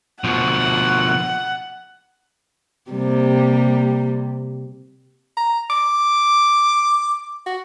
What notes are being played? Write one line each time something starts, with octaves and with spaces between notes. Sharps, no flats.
B2 F3 F#5
C3 G3 A#3
A#5
D6
F#4